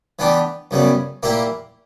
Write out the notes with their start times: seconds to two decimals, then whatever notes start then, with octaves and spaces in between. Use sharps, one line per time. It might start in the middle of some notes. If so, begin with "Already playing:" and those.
0.19 E3 B3 D4 G4
0.71 F#2 C#3 G3 B3
1.23 A#2 A#3 E4 G4